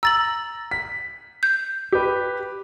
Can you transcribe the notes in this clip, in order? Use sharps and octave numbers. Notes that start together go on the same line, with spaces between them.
A#5 E6 A6 F#7
B6
G6
G4 B4